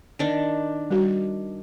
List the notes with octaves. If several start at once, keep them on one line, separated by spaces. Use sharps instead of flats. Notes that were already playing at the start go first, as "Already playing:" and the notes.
D#3 D4
G3 F#4